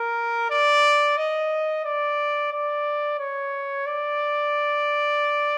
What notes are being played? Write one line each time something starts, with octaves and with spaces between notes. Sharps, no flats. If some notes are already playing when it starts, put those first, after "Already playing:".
Already playing: A#4
D5
D#5
D5
D5
C#5
D5